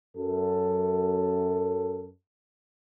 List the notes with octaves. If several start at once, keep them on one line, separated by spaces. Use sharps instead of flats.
F#2 A4